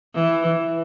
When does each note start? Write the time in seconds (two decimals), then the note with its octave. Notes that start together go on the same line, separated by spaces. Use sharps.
0.15 E3